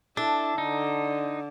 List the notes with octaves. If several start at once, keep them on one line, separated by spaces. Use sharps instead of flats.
D4 E4 A4
D3 D#4